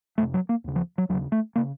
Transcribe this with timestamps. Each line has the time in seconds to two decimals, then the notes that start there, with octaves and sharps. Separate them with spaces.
0.18 F2 C3 A3
0.34 F#3
0.49 A#3
0.64 D#2 C#3
0.76 F3
0.98 F#3
1.09 D#2 F#3
1.13 C#3
1.32 A3
1.56 C#3 A#3